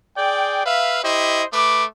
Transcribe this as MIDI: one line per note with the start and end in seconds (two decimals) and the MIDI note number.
0.17 0.62 68
0.17 0.62 74
0.17 0.62 79
0.65 0.99 71
0.65 0.99 76
0.65 0.99 77
1.03 1.43 64
1.03 1.43 67
1.03 1.43 72
1.03 1.43 75
1.52 1.84 57
1.52 1.84 71
1.52 1.84 86